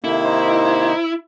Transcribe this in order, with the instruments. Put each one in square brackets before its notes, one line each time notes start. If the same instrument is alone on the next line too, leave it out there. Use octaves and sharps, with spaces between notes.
[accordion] C3 D#3 A#3 [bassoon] A3 [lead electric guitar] E4
[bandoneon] D#4 [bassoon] C5